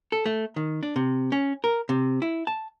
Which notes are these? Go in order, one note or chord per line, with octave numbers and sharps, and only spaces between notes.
A4
A3
D#3
D4
C3
C#4
A#4
C3
E4
A5